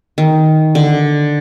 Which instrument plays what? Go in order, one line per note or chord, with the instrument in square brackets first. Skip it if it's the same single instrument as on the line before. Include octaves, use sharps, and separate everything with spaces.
[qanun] D#3
D3